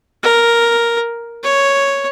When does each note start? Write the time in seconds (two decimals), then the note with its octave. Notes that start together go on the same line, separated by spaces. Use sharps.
0.23 A#4
1.43 C#5